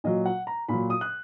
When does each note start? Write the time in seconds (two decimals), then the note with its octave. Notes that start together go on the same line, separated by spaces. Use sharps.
0.04 A#2 F#3 D#5
0.26 F#5
0.47 A#5
0.69 A#2 F#3 B5
0.90 D#6
1.01 F#6